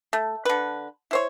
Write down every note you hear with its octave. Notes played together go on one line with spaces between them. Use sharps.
A3
D3 B4
E4 C5 C#5